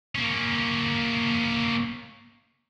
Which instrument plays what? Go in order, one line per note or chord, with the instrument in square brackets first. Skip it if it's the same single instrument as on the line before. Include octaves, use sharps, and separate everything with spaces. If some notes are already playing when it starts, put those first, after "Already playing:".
[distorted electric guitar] A#3 C#4